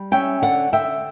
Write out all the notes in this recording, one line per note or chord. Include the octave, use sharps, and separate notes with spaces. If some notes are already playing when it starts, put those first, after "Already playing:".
Already playing: G3
C#4 E5 G5
D3 D5 F#5
D3 E5 G5